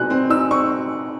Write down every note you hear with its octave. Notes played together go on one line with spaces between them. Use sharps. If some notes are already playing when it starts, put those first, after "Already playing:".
Already playing: B2 C4 D#4 F#6
C4
D#4 E6
C4 C#6